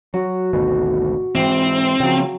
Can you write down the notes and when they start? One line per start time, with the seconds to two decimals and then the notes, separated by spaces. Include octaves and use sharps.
0.14 F#3 F#4
0.53 G#1 D2 B2
1.35 G#2 E3 C4 G5 C6
2.00 C#3 F3 F#3 G5